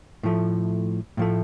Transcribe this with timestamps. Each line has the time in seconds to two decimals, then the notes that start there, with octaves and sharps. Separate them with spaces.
0.23 A2 F3 A3
1.17 A2 F3 A3